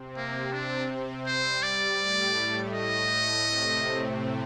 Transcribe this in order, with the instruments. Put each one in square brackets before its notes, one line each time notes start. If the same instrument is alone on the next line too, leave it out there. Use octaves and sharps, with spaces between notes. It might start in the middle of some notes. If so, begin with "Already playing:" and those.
Already playing: [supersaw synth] C3 C4
[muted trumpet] A#3
[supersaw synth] C3 C4 [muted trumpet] D4
[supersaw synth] G3 [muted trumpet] C5
[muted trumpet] D5
[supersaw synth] A2 A3
[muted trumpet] D#5
[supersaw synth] C3 C4